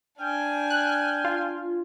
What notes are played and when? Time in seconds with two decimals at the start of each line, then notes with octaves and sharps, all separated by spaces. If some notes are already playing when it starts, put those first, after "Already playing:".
0.19 D4 G5 G#5 F6
0.70 F#6
1.25 F4